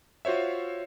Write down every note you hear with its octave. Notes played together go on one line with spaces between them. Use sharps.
F4 F#4 C5 C#5 E5